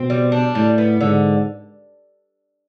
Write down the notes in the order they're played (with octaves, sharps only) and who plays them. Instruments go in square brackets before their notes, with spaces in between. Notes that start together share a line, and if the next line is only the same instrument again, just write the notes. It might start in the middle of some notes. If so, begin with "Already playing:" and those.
Already playing: [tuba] B2 [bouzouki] C4
[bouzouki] G3
D4
[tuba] A2 [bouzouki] G3
[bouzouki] B3
[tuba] G#2 [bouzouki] D3